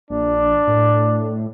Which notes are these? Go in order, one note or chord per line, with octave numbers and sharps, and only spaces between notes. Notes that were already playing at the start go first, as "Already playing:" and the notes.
A#1 D4
A2